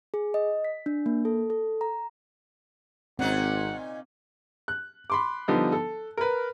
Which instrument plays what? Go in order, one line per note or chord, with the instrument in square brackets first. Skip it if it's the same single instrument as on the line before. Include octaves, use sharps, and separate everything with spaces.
[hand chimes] G#4
D#5
B6
D4
A#3
A4
A4
A#5
[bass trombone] G#1 [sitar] A#2 C#4 D#4 [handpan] C4 [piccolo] F#5
[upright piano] F#6
B5 C6 D6
D3 F3 G3 B3 D#4
A4
A#4 B4